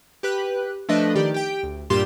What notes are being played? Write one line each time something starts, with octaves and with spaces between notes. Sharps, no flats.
G4 B4 F#6
F3 A3 D4 B4 D#5
D#3 G4 D5
G4 G5
D2
G2 A#2 F4 G4 C6 E7